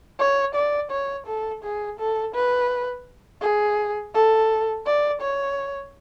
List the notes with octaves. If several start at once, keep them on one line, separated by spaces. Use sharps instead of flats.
C#5
D5
C#5
A4
G#4
A4
B4
G#4
A4
D5
C#5